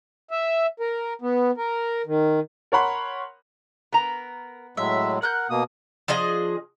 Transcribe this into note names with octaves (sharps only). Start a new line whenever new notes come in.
E5
A#4
B3
A#4
D#3
A#4 C#5 F#5 B5 C6
B3 A#4 A#5
A2 F#3 G#3 E5
A#4 F#5 F#6 G6
B2 A#3 D#6
F3 D4 G#4 D#5